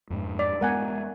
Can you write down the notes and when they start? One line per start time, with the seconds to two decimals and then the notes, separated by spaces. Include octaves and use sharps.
0.10 F2 G#2
0.39 D5
0.61 G#3 B3 A#4 F#5 G#5